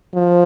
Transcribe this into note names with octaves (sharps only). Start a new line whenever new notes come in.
F3